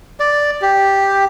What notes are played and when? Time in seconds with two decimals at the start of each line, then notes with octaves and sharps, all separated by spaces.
0.20 D5
0.62 G4